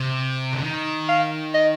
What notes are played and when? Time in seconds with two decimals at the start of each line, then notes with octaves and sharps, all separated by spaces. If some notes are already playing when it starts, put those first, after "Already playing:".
Already playing: C3
0.53 D3
0.63 D#3
1.09 F5
1.54 D#5